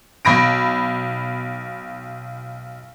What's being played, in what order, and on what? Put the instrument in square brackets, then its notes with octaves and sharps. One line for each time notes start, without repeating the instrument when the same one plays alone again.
[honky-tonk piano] B1 B5 A#6 D7